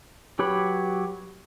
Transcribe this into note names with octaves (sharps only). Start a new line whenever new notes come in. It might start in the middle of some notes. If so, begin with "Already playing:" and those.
F#3 G4 B4 C#5 B5